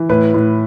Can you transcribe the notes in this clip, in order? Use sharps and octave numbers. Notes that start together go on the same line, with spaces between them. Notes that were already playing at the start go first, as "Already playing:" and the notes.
Already playing: E3
A2 B4
A2